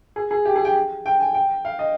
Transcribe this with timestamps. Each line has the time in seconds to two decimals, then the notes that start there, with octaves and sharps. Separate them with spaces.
0.16 G#4
0.31 G#4
0.45 G4
0.56 G#4
0.65 G5
1.06 G5
1.20 G#5
1.34 G5
1.65 F5
1.79 D#5